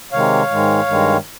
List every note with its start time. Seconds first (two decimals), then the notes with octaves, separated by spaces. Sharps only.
0.12 C3 D#3 G#3 C#5 F5
0.50 G#2 D#3 G#3
0.87 G2 D#3 G#3